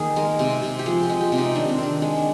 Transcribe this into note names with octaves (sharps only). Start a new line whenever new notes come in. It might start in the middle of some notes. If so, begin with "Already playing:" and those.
Already playing: D#3 A#3 G#4
G#3 A#4
C3
C3
G4
F3 G#4
G4
G#3
G4
C3
D#4
D#3 D4
C4
D#3 D4
G#3
D4